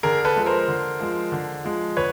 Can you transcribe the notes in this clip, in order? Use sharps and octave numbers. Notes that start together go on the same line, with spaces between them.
D3 G#4 A#4
A4 B4
F3 G#3
A#4 C5
D3
F3 G#3
D3
F3 G#3
D3 B4 C#5